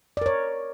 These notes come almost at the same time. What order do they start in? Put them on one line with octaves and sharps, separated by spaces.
D5 A#4 C#5